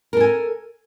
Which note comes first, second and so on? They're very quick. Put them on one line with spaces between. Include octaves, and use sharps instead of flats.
A#4 A4 G#5